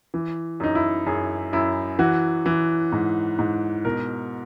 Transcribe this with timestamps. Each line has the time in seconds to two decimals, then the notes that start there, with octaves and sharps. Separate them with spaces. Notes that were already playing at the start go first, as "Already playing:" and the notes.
0.14 E3
0.60 F#2 D#4
0.75 E4
1.07 F#2 G#4
1.53 F#2 E4
1.99 E3 F#4
2.46 E3
2.92 G#2
3.39 G#2
3.85 B2 A#4